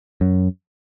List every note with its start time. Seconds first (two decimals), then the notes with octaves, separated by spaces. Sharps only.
0.21 F#2